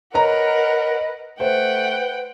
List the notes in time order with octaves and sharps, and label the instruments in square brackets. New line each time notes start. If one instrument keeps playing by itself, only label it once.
[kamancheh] A#4 F#5 [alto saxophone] B4 [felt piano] C#5 A#5 [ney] D#5
[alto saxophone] A3 [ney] B4 [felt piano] C5 [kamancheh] F#5 G5